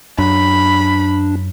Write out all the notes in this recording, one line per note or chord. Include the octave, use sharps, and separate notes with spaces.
F#2 D4 B5